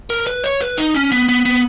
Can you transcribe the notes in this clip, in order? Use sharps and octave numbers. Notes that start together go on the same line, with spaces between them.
A#4
B4
C#5
B4
D#4
C#4
B3
B3
B3